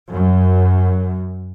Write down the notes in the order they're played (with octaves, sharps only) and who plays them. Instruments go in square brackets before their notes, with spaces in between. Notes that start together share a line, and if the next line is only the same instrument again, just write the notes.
[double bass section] F#2